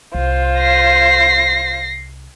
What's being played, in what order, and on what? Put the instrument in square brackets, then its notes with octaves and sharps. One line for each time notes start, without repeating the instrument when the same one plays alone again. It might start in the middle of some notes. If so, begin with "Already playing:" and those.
[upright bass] C2 [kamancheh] F4 C5
[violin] A#6 C7